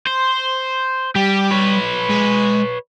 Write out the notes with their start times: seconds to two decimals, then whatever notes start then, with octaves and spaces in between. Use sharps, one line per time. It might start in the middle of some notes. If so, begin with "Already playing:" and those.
0.07 C5
1.16 G3 G4
1.51 B4 C#5
2.10 G#3